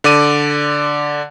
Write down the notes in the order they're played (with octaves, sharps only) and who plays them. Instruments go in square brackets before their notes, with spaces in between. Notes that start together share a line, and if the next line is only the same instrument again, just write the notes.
[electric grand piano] D3 D5 D6 D#7